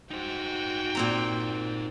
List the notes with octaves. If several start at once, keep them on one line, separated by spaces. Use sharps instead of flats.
D#4 F#4 C5 G5
A#2 C4 A#5